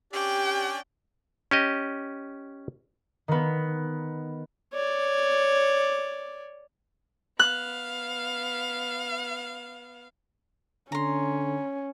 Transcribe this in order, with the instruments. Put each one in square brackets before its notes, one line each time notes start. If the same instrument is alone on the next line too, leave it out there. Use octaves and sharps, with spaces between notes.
[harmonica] C#4 D4 D5 [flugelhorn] G4 [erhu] G5
[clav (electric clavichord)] C#4 G4 D#5
[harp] D#3 B3
[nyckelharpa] C#5 D5
[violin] B3 F5 [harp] F#6
[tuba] D3 [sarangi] C#4 [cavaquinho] A#5 C6